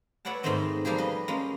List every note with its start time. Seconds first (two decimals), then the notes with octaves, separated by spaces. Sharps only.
0.25 A4 B4 C#5 D5 F#5 A5
0.43 G#2 D#3 G#3 A3 C4 D#5
0.85 F3 G3 A#3 G4 G#4
0.98 B4 D#5
1.28 G#3 A#3 C#4